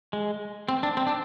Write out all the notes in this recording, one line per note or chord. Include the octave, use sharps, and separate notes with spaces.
G#3
C4
D4
C4
D4